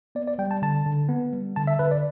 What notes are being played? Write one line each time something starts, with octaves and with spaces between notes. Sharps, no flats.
B3 D5
D5
G3 G5
A5
D3 A5
D3
B3
G3
D3 A5
E5
D3 B4
D5